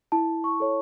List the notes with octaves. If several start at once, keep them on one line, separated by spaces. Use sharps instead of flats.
E4 A5
C#6
A4 C#5